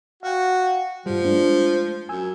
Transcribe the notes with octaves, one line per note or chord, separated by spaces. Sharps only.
F#4 F5 G5
G2 F3 G3
G#3 A3 D4
F#2 G#5 E6